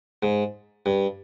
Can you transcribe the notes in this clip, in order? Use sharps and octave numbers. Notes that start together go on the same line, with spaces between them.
G#2
G2